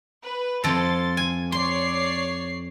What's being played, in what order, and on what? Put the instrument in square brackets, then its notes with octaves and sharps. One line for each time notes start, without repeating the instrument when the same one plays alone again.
[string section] B4
[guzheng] F2 A4 [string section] C6 A6
[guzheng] G#5
[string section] C#5 D5 C7 [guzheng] C6